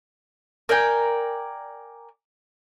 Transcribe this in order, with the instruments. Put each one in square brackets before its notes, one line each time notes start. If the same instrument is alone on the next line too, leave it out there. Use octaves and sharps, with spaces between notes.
[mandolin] A#4 D5 G5 G#5